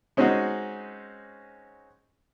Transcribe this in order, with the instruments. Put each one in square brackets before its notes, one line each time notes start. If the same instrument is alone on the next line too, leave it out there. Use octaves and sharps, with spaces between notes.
[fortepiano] G#3 C4 C#4 D#4 F#4